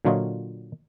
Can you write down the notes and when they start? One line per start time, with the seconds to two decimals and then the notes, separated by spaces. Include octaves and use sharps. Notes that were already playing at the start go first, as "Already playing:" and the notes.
0.05 A#2 D3 F#3 F4 C#5 D#5